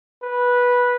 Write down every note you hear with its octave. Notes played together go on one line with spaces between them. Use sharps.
B4